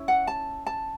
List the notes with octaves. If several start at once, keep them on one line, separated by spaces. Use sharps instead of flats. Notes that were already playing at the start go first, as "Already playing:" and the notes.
Already playing: C#4 E4
F#5
A5
A5